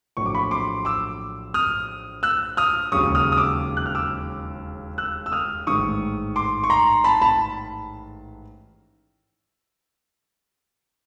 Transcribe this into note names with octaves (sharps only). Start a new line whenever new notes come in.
A#1 A2 F#3 C#6
D6
B5 C#6
C6 D6
D6 E6
D#6 F6
E6 F#6
D#6 F6
E1 D#2 C#3 F#3 C#6 D#6
D#6 F6
D#6
D6 E6
F#6
F6
D6 E6
E6 F#6
E6
D#6 F6
A1 G#2 D#3 C#6 D#6
C6 D6
C#6
A#5 C6
A5 B5
A5 B5